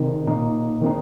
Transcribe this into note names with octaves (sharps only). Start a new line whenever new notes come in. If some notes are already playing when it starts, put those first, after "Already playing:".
Already playing: C3 D#3 C4 D#4
A#2 A#3 D#4
D#3 C4 D#4